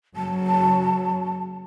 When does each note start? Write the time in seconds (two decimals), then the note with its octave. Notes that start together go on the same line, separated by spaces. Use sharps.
0.16 F#1 F#3 A5